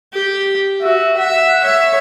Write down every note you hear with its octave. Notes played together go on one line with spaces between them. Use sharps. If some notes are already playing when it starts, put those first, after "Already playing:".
G4
F#4 E5
E5 F#5
C#5 E5